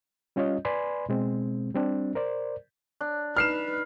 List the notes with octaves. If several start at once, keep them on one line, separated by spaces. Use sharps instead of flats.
G3 C#4 F4 C#5 D#5
B4 D5 G#5 B5 C6
B2 G#3 C4
G3 C4 D4
A#4 C5 D5
D4
D#4 B4 F6 C7 E7